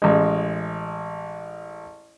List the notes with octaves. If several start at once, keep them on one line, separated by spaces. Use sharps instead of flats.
A1 G#3